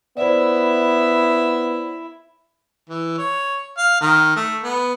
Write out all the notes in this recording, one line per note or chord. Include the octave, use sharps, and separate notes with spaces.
B3 E4 C5 D5 E5
E3
C#5
F5
D#3
A3
B3